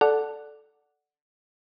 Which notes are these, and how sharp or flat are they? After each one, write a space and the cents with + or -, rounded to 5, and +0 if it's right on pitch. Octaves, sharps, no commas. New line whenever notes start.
A4 -5 D5 +0 F#5 +0